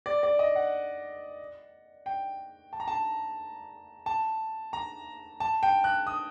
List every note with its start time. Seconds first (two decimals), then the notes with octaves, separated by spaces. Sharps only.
0.06 D5
0.23 D5
0.39 D#5
0.56 F#5
2.06 G5
2.73 A5
2.80 A#5
2.88 A5
4.06 A5
4.73 A#5
5.40 A5
5.63 G5
5.84 F#6
6.07 D#6